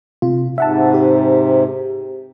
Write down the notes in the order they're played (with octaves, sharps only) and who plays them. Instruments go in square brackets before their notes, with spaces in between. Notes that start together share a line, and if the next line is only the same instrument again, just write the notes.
[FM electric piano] C3 F4
[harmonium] G#2 C3 [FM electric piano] E5 F#5 A5
[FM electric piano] G4